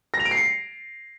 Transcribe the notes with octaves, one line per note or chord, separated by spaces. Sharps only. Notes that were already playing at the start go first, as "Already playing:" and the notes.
A#6
F7
D7
C7
C#7